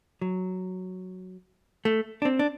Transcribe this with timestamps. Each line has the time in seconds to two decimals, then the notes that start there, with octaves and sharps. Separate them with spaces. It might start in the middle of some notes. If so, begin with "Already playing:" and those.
0.22 F#3
1.85 A3
2.22 D4
2.25 C4
2.39 D4